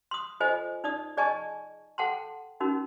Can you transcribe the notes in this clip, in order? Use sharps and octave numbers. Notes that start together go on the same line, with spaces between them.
C6 D#6
F4 A4 C5 D#5 G#5
D#4 D5 D#6
G#4 D5 D#5 G#5 A5 C#6
A4 F#5 G5 A5 C6
C#4 D#4 F#4 A#4